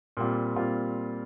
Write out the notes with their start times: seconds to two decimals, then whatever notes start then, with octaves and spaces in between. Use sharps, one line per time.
0.17 A#2 G3 C4 F4
0.56 A#2 G3 C4 F4